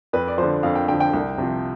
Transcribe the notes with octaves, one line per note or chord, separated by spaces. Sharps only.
F2 B4
D5
D3 F3 C5
F2 F5
G5
D3 F3 G5
G5
C2
C3 F3